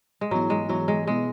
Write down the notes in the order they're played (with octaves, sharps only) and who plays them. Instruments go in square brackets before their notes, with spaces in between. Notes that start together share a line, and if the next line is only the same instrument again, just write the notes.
[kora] G#3
[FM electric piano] G#2 E3 B3 E4 [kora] F#3
[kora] G#3
[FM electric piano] G#2 E3 B3 E4 [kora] F#3
[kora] G#3
[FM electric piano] B2 B3 E4 [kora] G#3